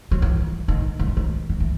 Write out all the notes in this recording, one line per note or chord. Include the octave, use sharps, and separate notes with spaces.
F#3
E3
D#3
D#3
E3
D#3
D#3
E3